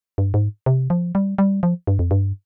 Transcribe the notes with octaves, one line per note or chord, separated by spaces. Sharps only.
G2
G#2
C3
F3
G3
G3
F3
G2
F2
G2